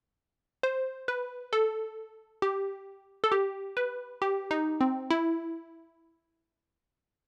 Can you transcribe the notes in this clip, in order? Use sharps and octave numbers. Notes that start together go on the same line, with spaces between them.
C5
B4
A4
G4
A4
G4
B4
G4
D#4
C4
E4